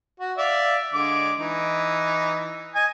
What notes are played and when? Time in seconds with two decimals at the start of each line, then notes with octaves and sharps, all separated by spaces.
0.20 F#4
0.37 D5 E5 F5
0.94 D3 G#3 D6
1.38 E3 D#4
2.75 D#5 G#5